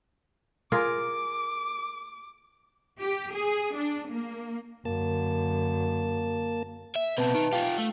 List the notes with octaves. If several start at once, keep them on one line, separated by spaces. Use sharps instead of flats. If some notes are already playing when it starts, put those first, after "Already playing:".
F4 G#4 A#4 D6
G4
G#4
D4
A#3
F#2 D3 A#3 A5
E5
B2 C4 B4 A5
D#3
F4 G4 F5
A3